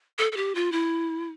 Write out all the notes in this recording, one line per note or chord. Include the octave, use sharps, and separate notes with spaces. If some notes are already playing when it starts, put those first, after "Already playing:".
A4
A4
G4
F4
E4